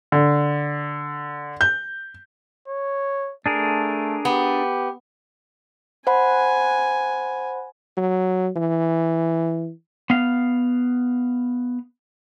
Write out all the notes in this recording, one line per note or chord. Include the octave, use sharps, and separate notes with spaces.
D3
G6
C#5
A3 D4 G#4 A#4
B3 G4
C5 F#5 G#5 B5
F#3
E3
B3 F5